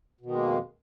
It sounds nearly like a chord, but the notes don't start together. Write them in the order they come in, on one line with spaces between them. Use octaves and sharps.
B2 D#3 G#3 A#3 F2